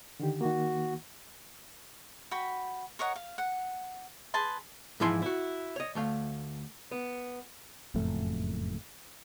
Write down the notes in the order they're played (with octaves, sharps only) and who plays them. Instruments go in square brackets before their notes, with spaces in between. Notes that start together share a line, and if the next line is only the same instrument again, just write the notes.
[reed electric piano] D3 D#3 G4
[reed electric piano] D#3 A#3 [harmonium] F#4
[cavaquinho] F#4 G5 B5
A#4 C#5 D#5 F#5
F5
F#5
G#4 B4 A5 C6
[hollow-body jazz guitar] G#2 E3 F3 E4 G#5 C6
E4 F#4
C#5 D#5
D2 A3 F5
B3
[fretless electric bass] F#1 F2 A2 A3